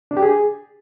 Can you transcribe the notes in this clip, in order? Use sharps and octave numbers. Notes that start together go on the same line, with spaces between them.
D4
G4
G#4